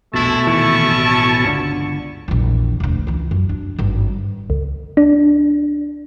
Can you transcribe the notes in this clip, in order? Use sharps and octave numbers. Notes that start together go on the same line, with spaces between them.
E1 A#1 B2 G#3 A3 E4 A5
D#1 D#2 E3 C#4 E4 C#6
A1
G1 C#2 D3
A#1 E2
E1 D2
C#2 E3
F#2
D4
G#1 G2
C#2
D4